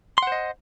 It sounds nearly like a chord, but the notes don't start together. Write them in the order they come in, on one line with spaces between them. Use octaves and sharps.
C6 F#5 C5 D#5